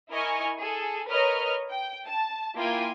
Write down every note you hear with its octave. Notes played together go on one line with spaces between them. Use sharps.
E4 A#4 D#5 G#5 C#6 F6
G#4 A4
A#4 B4 C#5 D#5 A#5 F6
G5
A5
A#3 E4 F4 G5 G#5